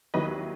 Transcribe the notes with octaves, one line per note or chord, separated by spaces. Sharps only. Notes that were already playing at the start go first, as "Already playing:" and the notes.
D#2 D#3 F#3 A#3 E4 B4 D#5